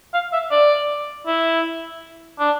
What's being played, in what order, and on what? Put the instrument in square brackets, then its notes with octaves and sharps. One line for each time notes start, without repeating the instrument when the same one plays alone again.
[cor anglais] F5
E5
D5
E4
D4